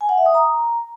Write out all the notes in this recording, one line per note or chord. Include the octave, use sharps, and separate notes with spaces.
G#5
F#5
E5
D#6
A#5